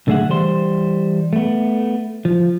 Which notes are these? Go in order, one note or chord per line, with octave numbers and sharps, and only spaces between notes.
B1 D3 A3 G#4 E5 F#5
E3 G3 C5 C6
A3 B3
F3